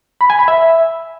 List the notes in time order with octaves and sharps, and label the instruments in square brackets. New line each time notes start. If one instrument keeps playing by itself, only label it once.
[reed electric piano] B5
G#5
B5
E5